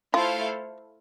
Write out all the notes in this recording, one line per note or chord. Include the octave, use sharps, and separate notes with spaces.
A3 E4 F4 A4 C5 F5